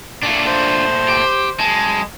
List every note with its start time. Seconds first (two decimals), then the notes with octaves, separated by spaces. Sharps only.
0.23 A#2 A3 D4 F4
0.47 C5
1.09 G4
1.60 F#2 G#3 A5